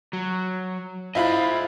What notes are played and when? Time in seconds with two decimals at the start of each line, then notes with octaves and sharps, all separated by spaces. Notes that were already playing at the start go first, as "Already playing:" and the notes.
0.13 F#3
1.15 E4 F4 C5 D#5 B5